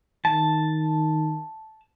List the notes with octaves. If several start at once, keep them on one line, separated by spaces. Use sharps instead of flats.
D#3 A5